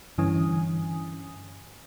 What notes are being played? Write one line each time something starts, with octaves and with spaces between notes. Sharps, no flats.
G2 D3 E3 C#4 G#5 D#6